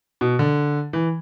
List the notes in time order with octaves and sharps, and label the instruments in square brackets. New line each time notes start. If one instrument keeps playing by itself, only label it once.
[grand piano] B2
D3
E3